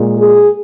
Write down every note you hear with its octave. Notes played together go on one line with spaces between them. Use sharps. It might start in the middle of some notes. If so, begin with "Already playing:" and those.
Already playing: A#2 G#3
G#4